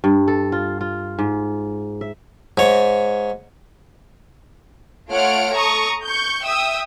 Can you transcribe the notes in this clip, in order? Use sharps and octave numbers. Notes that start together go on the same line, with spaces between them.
G2
A4
F4
F4
G#2
E5
G#2 C#5
A3 F4 C#5 F#5 F6 D7
A4 A#5 C#6 D#6
C#6 G6
E5 G5 D#6 E6